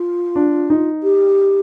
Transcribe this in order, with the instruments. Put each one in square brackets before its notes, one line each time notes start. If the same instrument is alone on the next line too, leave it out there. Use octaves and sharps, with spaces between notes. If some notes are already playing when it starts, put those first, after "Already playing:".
Already playing: [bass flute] F4
[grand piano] D4
D#4
[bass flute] G4